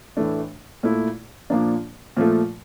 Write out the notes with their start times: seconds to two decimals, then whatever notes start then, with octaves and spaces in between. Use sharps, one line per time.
0.17 A2 E3 A3 D4
0.83 A#2 A3 E4
1.50 A#2 F3 A#3 D4
2.17 A#2 F3 A3